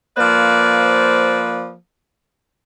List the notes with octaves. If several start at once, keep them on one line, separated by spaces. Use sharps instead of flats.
F3 A#3 B4 C5 D5